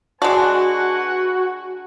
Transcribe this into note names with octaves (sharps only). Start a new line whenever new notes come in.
G#3 D4 F#4 B4 F#5 G#5